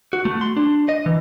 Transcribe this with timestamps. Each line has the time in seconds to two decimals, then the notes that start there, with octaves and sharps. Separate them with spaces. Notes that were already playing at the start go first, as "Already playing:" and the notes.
0.13 F#4
0.25 A3
0.41 C6
0.57 D4
0.89 D#5
1.06 E3